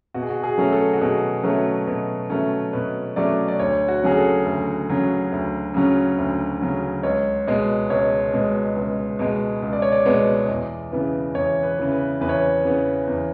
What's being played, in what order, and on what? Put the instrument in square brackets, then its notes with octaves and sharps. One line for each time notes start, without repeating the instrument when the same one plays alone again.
[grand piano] B2 F#4
G#4
F#4
G#4
F#3 A3 C#4
A4
F#4
B2 G#4
F#3 A3 C#4
B2
F#3 A3 C#4
B2 B4
F#3 A3 C#4 D5
D5
D2 C#5
F#4
C#3 F#3 C#4 G#4
A4
D2 A4
C#3 F#3 C#4
D2
C#3 F#3 C#4
D2
C#3 F#3 C#4
C#2 C#5
B2 G#3 B3
C#2 C#5
B2 G#3 B3
C#2
B2 G#3 B3
C#2
D5
C#5
D5
B2 G#3 B3
E2
C#3 E3 B3
E2 C#5
B4
C#3 E3 B3
B4
E2 B4
C#5
B4
C#3 E3 B3
E2